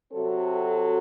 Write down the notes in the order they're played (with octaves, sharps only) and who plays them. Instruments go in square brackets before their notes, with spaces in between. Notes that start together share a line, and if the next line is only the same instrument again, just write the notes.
[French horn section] C3 F#3 C4 F#4 A4